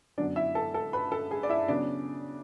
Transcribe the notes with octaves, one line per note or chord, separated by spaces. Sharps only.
F#2 D3 F#3 B3 D4 D5
E4 E5
A4 A5
A4 A5
B4 B5
A4 A5
G#4 G#5
D5
E4 E5
C#3 F#3 B3 D4 D5